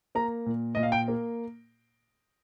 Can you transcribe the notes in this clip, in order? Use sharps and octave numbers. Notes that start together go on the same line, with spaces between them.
A#3 A#5
A#2
A#2 D#5
F5
G5
A#3